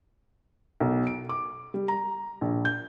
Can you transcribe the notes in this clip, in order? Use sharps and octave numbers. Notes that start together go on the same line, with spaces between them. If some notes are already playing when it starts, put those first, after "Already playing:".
B1
D7
D6
G3
A#5
A#1
G6